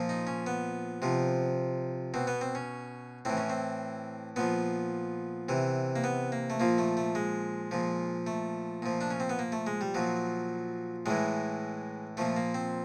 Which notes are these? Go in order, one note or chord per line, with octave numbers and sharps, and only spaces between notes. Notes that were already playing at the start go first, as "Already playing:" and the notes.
Already playing: A#2 F3
D#4
C#4
B3
C3 F3
B2 C4
B3
C4
C#4
A2 E3 C4
C#4
C4
A#2 F3 B3
C3 E3
A#3
B3
A#3
A3
A#2 F3 A#3
A3
A3
G#3
A#2 F3
A3
A#2 F3
D4
C#4
C4
B3
A#3
A3
G#3
G3
A#2 F3 F#3
A2 E3 G#3
A#2 F3 A3
A#3
C4